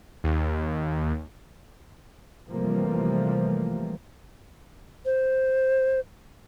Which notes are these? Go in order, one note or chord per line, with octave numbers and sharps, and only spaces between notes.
D#2
C3 E3 F3 G3 A3 A#3
C5